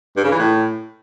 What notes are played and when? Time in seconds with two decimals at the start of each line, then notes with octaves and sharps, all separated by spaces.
0.17 G2
0.24 C#3
0.31 E3
0.39 A2